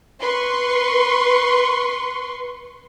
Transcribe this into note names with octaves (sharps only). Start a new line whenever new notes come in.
B4 C6 C#6